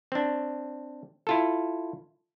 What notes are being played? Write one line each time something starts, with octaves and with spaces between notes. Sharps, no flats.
C4 D4
E4 F4 A4